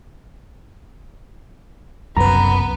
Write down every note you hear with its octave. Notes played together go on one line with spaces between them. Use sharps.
F#1 C2 F#2 B3 B4 A#5